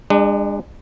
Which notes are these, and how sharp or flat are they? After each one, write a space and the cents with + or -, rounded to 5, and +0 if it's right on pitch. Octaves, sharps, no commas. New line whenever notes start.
G#3 -35 D4 +25